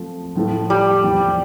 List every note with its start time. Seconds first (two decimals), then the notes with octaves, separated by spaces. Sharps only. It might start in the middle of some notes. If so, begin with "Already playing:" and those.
Already playing: F3 A3 C4
0.36 A2 F3 A3
0.70 G3
1.04 E2 C3 F3 C4